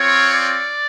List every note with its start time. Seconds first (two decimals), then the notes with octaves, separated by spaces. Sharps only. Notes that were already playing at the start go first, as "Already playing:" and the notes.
Already playing: C4 F4 C#5
0.33 D5